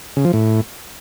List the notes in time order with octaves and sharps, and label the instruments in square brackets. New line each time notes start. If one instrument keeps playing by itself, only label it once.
[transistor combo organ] C#3
F3
A2